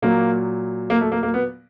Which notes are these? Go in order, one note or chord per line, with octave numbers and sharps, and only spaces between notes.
A#2 F#3 A#3
A#3
A3
A#3
A#3
B3